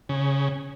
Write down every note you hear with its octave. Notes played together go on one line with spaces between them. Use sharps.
C#3